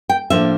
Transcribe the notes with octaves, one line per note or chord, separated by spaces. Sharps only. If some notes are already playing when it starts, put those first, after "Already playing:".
G5
A2 F3 A#3 D4 E5